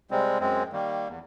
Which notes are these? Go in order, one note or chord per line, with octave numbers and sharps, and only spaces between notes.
C3 G3 G#3 C4
F#2 G#3 C4
D#3 G3 A#3
E2